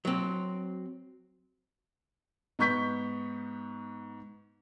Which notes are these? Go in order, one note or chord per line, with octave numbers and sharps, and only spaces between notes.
F#3 C4
G#2 B3 C#6 G6 B6